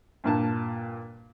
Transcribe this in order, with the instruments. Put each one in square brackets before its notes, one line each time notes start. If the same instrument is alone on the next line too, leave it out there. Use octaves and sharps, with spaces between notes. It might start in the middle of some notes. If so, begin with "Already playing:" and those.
[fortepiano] G2 A#2 A5